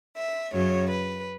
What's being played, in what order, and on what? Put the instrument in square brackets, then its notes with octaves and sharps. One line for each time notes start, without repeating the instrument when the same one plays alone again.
[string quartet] E5
F#2 C#3 F#3 C#5
B4